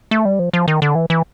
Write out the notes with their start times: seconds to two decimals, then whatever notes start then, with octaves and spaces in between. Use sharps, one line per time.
0.11 A3
0.25 G3
0.39 F3
0.53 F3
0.68 D#3
0.82 D3
0.95 E3
1.10 E3